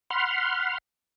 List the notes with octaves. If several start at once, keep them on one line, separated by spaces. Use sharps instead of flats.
F#5 B5 C6 F6